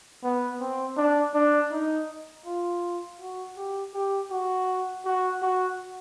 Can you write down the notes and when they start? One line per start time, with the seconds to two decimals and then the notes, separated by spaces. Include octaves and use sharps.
0.24 B3
0.60 C4
0.97 D4
1.34 D4
1.72 D#4
2.46 F4
3.20 F#4
3.57 G4
3.95 G4
4.31 F#4
5.05 F#4
5.42 F#4